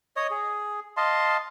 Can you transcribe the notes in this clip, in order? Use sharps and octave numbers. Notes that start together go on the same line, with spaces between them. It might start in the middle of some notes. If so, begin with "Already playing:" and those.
C#5 D#5 D#6
G#4
D#5 F5 A5 C6